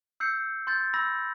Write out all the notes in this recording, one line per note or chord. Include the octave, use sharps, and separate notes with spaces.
E6 G6 C7 C#7
C6 G6 A6
B5 E6 A#6